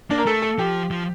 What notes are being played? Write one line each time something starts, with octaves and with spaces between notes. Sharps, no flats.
A#3 D4
A#4
A3 A4
A4
F3 G4
F3